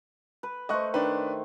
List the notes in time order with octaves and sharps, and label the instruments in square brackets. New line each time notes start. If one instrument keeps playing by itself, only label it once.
[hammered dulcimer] B4
[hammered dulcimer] A3 C5 [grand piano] D#5 C#6 F#6
[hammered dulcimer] D#3 [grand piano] D4 B4